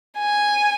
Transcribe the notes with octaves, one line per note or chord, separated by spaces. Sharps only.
G#5